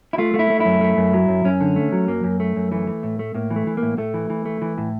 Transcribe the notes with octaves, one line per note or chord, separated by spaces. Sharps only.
E4
A3 F4
A3
E4
A3
F#2 E4
A3
F#2
F#3
F#2
F#2 C#4
D3
A3
F#3
F#2 A#3
F#2
A3
F#2
E3 A3
E3
A2
A3
A2 A#3
E3
A3
E3
A#3
A2
A2 A3
E3
E3
A3
E3
A2